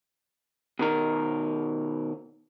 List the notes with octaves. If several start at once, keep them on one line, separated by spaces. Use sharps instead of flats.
B2 D#3 A#4